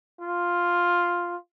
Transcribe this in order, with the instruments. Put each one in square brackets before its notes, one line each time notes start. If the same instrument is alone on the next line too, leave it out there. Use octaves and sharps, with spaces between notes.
[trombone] F4